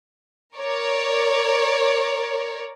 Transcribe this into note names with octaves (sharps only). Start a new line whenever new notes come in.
A#4 C#5 D5